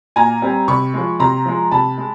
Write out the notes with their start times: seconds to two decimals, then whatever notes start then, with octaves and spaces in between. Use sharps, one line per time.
0.16 A#2 G#5 A#5
0.42 G3 C4
0.68 C3 B5 C#6
0.94 F3 G#3
1.20 C3 A#5 C6
1.46 F3 G#3
1.71 C3 A5 B5
1.98 G#3